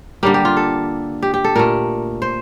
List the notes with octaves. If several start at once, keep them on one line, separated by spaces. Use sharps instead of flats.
D3 G3 A#3 G4
G4
F4
A4
G4
G4
A4
A#2 A3 A#4
C5